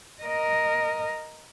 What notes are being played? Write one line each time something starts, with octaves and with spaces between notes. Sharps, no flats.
A#4 D#5